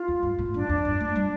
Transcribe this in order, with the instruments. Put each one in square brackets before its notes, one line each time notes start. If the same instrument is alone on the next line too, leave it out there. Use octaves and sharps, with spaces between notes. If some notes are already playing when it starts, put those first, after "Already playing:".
Already playing: [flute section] F4
[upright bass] F2
G2
A2
[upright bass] G2 [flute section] D4
[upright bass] F2
G2
A3
G3